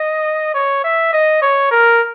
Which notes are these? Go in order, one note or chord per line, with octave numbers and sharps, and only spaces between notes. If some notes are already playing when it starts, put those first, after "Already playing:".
Already playing: D#5
C#5
E5
D#5
C#5
A#4